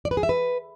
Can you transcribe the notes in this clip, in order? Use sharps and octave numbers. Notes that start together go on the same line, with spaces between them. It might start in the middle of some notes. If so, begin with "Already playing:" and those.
D5
B4
G#4
E5
B4